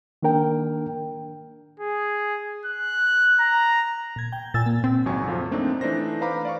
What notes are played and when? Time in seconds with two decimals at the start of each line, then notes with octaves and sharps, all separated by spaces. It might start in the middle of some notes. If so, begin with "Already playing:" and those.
0.22 D#3 A#3 D4 A#4 G5
1.80 G#4
2.65 F#6
3.40 A#5
4.16 A#2 G#6
4.32 G5
4.54 A#2 G#5 E6 A6
4.66 A#3
4.84 A#2 C4
5.05 G#1 C#2 F#3 G#5 C#6
5.28 F2 F3 F4
5.51 A3 A#3 C4 D4 D#4
5.81 E3 A3 D4 D#4 C5 A#6
6.21 B4 C5 F5 A#5 B5 D6
6.45 D5 F5 C#6